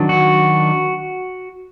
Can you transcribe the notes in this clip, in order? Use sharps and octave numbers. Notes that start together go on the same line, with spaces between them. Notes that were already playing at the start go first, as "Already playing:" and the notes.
Already playing: D#3 F#3 D4
F#4